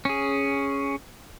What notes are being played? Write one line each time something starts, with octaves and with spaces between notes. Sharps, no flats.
C#4 G#4